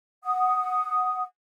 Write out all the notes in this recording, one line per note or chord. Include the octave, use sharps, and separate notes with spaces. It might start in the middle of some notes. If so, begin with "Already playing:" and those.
F#5 D#6